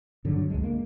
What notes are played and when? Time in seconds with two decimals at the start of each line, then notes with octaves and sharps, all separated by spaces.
0.24 G2 D3 F#3
0.50 C#2 G#3
0.63 A#3